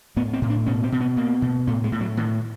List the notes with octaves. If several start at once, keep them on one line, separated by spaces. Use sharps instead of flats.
A2 B3
C4
A2
D4
B2 C#4
C4
B2
B3
B2 A#3
B2
A2 A3
G#3
A2
F#3
A2 D#3